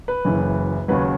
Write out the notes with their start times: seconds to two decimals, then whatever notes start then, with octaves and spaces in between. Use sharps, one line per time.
0.08 B4
0.25 F#1 F#2 E3
0.88 D#2 C#3 F#3 B4